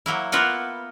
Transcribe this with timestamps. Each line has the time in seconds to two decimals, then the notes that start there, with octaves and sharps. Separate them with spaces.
0.06 F#3 A#3 E4
0.32 A#3 B3 F4 A#4 E5 F#5